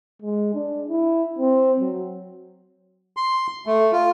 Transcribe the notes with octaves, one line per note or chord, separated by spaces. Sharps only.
G#3
D4
E4
C4
F#3
C6
A3
F4